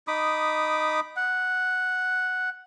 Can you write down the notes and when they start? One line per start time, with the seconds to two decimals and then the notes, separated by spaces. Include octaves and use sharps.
0.08 D#4 B5 D6 D#6
1.16 F#5